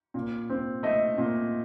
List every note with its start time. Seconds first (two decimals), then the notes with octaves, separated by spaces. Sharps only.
0.14 A#2
0.50 C4
0.83 A3 D#5
1.18 A#2